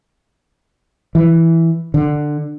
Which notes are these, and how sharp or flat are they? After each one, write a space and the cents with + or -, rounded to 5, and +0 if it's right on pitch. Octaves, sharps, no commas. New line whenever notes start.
E3 +0
D3 +15